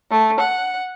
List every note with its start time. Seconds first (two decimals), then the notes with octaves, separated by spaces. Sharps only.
0.10 A3
0.39 F#5